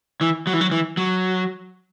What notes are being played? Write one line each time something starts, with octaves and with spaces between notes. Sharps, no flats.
E3
F#3
E3
F#3
E3
F#3